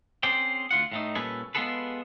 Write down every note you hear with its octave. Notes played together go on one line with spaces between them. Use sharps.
C4 C#4 G#4 C5 D5 G5
D2 F4 F#5
A2 A3 D#4
A#2 G3 C#4 A4 B4 G#5
G#3 B3 F4 G#4 A4 B4